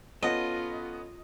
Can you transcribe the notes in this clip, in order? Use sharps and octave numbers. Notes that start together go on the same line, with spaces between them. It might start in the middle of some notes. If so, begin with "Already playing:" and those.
B3 C#4 F4 A4 D#5